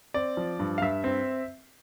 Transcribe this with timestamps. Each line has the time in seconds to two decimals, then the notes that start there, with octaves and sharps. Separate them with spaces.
0.14 C4 D5
0.37 F3
0.59 G2
0.78 F5
0.82 G2 E5
1.04 C4